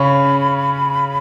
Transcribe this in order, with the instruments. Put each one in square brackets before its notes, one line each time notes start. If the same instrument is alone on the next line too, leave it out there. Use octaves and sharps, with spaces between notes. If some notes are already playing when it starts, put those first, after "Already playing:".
Already playing: [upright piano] C#3 C#4 [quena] B5